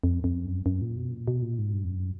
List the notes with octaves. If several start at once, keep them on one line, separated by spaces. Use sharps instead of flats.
F2
F2
F#2
F#2
A#2
B2
A#2
B2
A#2
G#2
G2
F2
F#2